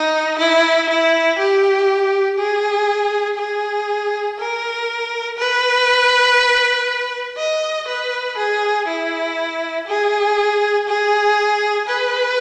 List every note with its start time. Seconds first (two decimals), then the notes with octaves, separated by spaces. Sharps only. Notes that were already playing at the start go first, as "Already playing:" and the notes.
Already playing: D#4
0.39 E4
0.89 E4
1.38 G4
2.38 G#4
3.38 G#4
4.39 A#4
5.38 B4
7.37 D#5
7.88 B4
8.38 G#4
8.88 E4
9.87 G#4
10.88 G#4
11.88 B4